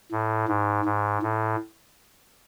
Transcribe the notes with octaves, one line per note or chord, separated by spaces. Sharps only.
A2
G#2
G#2
A2